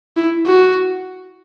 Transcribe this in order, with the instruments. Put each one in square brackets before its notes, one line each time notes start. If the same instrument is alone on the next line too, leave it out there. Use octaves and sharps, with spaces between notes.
[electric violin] E4
F#4